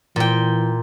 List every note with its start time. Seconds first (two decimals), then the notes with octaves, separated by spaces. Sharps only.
0.16 A#2 E3 G5